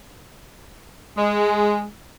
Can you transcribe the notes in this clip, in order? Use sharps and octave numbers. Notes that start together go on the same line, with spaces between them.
G#3